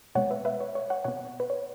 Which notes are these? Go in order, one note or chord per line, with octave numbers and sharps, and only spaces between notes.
B2 G#3 B3 C#5 F#5
B4 E5
B4 E5
C#5
C#5
C#5 F#5
B2 B3 C#5 F#5
B4
C#5